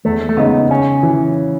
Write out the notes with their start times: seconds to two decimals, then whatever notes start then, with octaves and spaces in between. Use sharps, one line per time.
0.05 E2 A3
0.29 A3
0.37 C#3 G#3 B3 D#4
0.70 C#3 C#4
1.03 E3